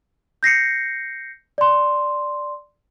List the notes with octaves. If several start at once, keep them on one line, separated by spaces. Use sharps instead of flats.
G6 A#6 C7 C#7
D5 C6